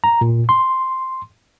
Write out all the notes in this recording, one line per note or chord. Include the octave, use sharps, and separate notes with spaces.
A#5
A#2
C6